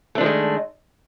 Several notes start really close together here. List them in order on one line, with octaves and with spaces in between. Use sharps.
A3 D4 F3 D#3 G#3